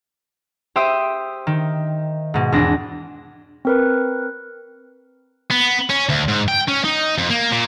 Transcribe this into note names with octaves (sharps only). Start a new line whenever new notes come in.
G4 C5 E5 G5 C6 D#6
D#3
G#2 B2
E2 C4 D4 A#6
C4 A#4 B4
B3
C#4
D2
G#2
G5
C#4
D#4
F2
A#3
A#2